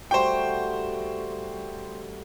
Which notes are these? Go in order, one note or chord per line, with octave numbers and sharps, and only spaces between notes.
G3 A3 F#4 C5 G5